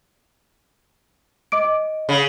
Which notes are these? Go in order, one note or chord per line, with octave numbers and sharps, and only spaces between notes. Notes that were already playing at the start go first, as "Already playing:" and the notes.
D#5 D6 D7
D#5
C#3